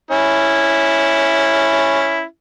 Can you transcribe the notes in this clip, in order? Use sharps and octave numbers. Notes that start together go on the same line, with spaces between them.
C#4 E4